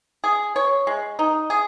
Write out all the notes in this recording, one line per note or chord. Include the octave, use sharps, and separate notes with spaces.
G#4
C#5
G#3
D#4
G#4